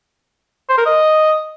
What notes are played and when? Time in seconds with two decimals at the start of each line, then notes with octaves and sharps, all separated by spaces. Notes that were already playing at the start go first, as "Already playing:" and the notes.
0.69 C5
0.78 A#4
0.86 D#5